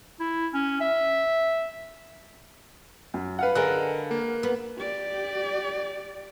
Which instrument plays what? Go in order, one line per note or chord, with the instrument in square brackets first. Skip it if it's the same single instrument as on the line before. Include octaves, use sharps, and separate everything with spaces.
[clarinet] E4
C#4
E5
[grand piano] F#2
B4 F5 F#5
[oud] D3 G#3 [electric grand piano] A#4 F#6
[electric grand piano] A#3
[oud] B3
[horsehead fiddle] G4 D5